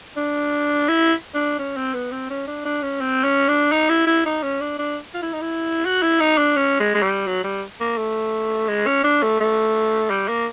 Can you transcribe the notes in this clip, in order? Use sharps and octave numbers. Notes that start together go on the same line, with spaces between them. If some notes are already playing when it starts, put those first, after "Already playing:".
D4
E4
D4
C#4
C4
B3
C4
C#4
D4
D4
C#4
C4
C#4
D4
D#4
E4
E4
D#4
C#4
D4
D4
F4
E4
D#4
E4
F#4
E4
D#4
D4
C#4
G#3
G#3
G3
F#3
G3
A#3
A3
G#3
C#4
D4
A3
A3
G3
A#3